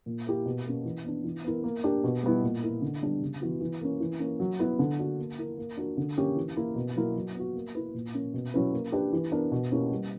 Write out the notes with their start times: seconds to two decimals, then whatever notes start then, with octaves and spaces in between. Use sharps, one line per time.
0.06 A#2
0.27 A#3 E4 G4 A#4
0.46 B2
0.66 A#3 C#4
0.85 E3
1.05 B3 D4
1.24 E3
1.44 B3 E4 A#4
1.64 A#3
1.84 D4 G4 A#4
2.04 B2
2.23 G3 B3 E4
2.43 A#2
2.63 A#3 E4 A#4
2.82 D3
3.02 G3 B3 D4 G4
3.22 C#3
3.41 E3 B3 F#4
3.61 E3
3.81 A#3 C#4
4.00 E3
4.20 A#3 C#4
4.40 F#3
4.59 B3 E4 B4
4.79 D3
4.99 A#3 D4 F#4
5.19 A#3
5.38 E4 A#4
5.58 A#3
5.77 D4 F#4 A#4
5.97 D3
6.18 A#3 C#4 G4
6.36 E3
6.56 A#3 E4 A#4
6.76 B2
6.96 F#3 A#3 E4 A#4
7.16 F#3
7.35 B3 F#4
7.55 A#3
7.75 E4 B4
7.94 A#2
8.14 A#3 C#4
8.34 B2
8.54 F#3 C#4 E4 B4
8.73 A#3
8.92 D4 G4 B4
9.13 E3
9.32 B3 D4 A#4
9.51 B2
9.72 A#3 C#4 E4 G4
9.91 G3